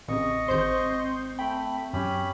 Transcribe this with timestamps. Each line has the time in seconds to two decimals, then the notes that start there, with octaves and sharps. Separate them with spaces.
0.08 A1 C#3 C4 D#5 C#6
0.48 G#1 C5 C6 G6
1.39 A3 G5 B5
1.93 F#2 C#4 G4 B5